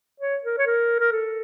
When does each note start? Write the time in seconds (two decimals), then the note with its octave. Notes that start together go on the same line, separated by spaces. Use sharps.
0.20 C#5
0.44 A#4
0.59 C#5
0.67 A#4
1.00 A#4
1.13 A4